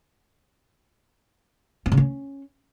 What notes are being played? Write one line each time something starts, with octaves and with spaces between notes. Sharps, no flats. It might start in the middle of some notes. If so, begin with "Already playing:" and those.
C4
C#3
C#4